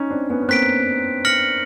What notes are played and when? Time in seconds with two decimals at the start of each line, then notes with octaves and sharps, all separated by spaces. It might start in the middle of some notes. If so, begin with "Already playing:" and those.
Already playing: C#4 D#4
0.10 C4 D4
0.30 B3 C#4
0.42 C#4
0.48 A#3 C4 F#6 B6 D7
1.25 F6 A#6 C#7 F#7